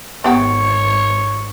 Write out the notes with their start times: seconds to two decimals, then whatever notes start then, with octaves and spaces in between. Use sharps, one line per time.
0.24 G#1 B3 G4 C#5 G5